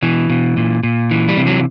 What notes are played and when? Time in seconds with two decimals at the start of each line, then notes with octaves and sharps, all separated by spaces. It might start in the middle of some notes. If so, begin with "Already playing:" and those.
0.02 B2 E3
0.30 B2
0.57 A#2
0.83 A#2
1.11 E3
1.29 G3
1.37 C3
1.47 F#3